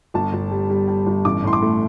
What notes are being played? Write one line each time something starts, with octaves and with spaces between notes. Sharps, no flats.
G1 A5
G1
G3
G3
G3
G1
A1 D6
A2 C6
D6
A3